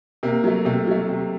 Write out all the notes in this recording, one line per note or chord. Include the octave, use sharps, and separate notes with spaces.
C3 A#3
F#3 A3
C3 A3
F#3 A3
C3